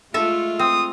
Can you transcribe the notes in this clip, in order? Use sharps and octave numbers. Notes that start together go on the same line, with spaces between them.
G#3 A3 F4 A4 E5
C4 D#6